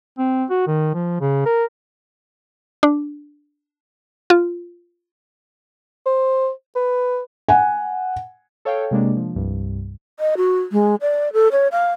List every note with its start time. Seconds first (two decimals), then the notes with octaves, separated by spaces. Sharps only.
0.18 C4
0.50 F#4
0.67 D#3
0.94 F3
1.21 C#3
1.46 A#4
2.83 D4
4.30 F4
6.06 C5
6.76 B4
7.49 F#5 G#5
8.65 A4 C#5 F5 G5
8.91 C3 G#3 A#3 D4
9.17 F3
9.36 C2 G2
10.20 D#5
10.37 F#4
10.72 G#3
11.01 D5
11.33 A4
11.52 C#5
11.72 F5